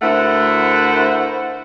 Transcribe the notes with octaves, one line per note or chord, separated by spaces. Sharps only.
D2 A3 E4 A#4 C5 F#5